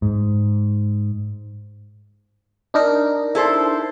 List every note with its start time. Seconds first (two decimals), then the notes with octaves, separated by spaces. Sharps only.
0.02 G#2
2.74 D4 D#4 A#4
3.35 E4 A4 C5